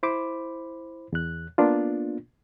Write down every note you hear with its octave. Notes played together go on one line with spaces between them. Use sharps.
E4 C5 B5 D6
E2 F#6
A#3 B3 D4 F4